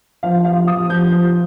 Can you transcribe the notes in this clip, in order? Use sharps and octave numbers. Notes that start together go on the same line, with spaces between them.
F3 F5
F3 F5
F3 D#6
F3 G6
F3